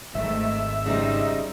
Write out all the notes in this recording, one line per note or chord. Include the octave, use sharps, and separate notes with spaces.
G#1 G#2 D#3 A3 E5
C#3 G3 C4 D#4